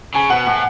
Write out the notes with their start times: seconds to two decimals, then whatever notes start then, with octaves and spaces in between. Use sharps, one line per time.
0.14 C#3 G#5
0.30 B2 F#5
0.46 A2